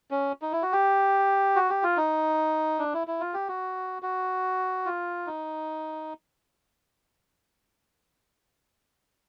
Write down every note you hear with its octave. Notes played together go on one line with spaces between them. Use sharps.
C#4
D#4
E4
F#4
G4
F#4
G4
F4
D#4
D4
E4
E4
F4
G4
F#4
F#4
F4
D#4